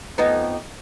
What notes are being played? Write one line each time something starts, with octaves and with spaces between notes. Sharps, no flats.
F2 B3 D#4